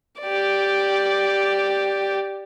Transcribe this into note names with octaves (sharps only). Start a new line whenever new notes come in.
G4 D5